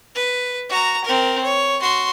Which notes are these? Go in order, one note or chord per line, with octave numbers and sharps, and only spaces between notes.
B4
F#4 A#5
C4 A#4
C#5
F#4 C6